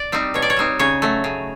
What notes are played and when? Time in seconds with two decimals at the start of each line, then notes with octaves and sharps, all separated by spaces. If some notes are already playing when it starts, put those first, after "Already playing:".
Already playing: D5
0.12 G3 C4 D#4
0.34 B2 C#5
0.42 D5
0.50 C#5
0.57 G3 C4 D#4
0.79 C#3 C#5
1.02 F#3 A3
1.24 C#3